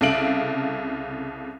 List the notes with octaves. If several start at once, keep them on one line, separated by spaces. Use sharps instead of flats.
C2 C#3 A4 F5 D7 F#7